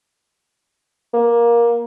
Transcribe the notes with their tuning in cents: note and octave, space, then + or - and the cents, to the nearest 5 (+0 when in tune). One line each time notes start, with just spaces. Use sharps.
A#3 +15